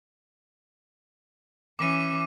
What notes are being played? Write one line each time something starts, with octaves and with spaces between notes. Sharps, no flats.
E3 C#4 D6 D#7